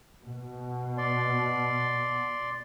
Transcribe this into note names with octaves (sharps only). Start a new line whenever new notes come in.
B2
D5 C6